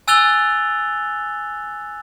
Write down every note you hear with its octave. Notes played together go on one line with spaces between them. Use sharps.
G#5 E6 F#6 A6 F7 G7